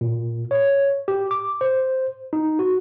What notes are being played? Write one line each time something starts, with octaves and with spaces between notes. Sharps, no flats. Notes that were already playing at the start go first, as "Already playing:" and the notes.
A#2
C#5
G4
D6
C5
D#4
F#4